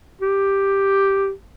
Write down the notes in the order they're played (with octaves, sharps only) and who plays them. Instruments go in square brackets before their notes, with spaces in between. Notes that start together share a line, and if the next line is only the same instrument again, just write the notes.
[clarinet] G4